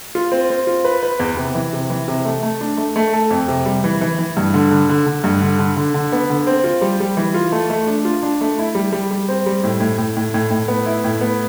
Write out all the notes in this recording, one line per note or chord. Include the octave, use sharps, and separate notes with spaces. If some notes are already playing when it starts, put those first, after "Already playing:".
F4
C4
C4
F4
B4
B4
E2
C3
E3
C3
E3
C3
A3
A3
D4
A3
A3
A4
F2
C3
G3
E3
E3
E3
G2
D3
D3
D3
D3
G2
D3
D3
D3
D3
B3
D3
C4
F4
G3
G3
E3
F4
A3
A3
D4
F4
D4
A3
E4
G3
G3
G3
C4
G3
A2
A2
A2
A2
A2
A2
B3
E4
A2
B3